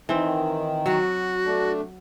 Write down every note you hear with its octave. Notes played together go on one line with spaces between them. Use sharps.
D#3 E3 C4
F#3 F#4
A3 D4